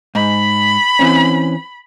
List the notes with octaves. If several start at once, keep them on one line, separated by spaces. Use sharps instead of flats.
G#2 B5
E3 C4 C#4